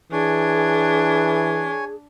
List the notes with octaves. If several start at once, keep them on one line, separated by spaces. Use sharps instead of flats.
E3 D4 G#4 C#5 G#5